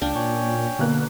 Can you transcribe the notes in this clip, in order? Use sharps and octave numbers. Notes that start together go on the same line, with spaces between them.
C#2 D4 F5 G5
A#2 C#4 C#5 G5
B2 D3 A#3 F#6